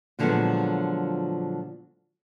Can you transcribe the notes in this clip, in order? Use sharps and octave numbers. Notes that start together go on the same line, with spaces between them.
A#2 D3 F3 F#3 G#3 B3